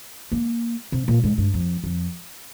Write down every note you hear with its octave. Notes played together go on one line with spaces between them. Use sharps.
A#3
C3
A#2
G#2
G2
F2
F2